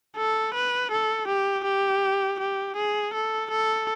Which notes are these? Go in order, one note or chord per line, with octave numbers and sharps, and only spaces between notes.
A4
B4
A4
G4
G4
G4
G#4
A4
A4